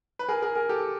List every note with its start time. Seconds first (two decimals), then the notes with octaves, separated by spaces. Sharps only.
0.19 B4
0.29 G#4 A#4
0.42 G#4 A#4
0.55 G#4 A#4
0.69 G4 A4